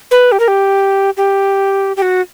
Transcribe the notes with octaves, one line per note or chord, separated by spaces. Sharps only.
B4
G4
A#4
G4
G4
G4
F#4